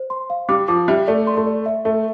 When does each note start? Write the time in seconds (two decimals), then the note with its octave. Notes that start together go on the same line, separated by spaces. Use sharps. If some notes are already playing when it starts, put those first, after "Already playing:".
Already playing: C5
0.10 C6
0.30 F5
0.49 G3 D6
0.68 F3 D6
0.88 G3 E5
1.07 A3 D5
1.27 C6
1.37 A3
1.46 D5
1.66 E5
1.85 A3 E5